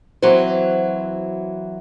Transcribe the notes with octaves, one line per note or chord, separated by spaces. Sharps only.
E3 F#3 C4 F#4 C5